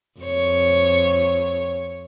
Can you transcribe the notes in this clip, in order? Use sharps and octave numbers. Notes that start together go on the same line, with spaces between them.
F2 C#5